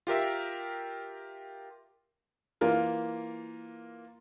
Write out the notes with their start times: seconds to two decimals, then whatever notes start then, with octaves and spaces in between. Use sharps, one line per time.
0.07 F4 G4 A#4 E5
2.61 E3 A#3 F4 A#4